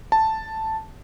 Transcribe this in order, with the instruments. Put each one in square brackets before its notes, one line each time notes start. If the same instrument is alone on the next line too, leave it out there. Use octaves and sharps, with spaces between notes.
[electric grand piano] A5